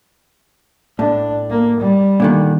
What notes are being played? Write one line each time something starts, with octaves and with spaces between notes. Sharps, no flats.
A2 D4
A#3
G3
A#2 D3 D#3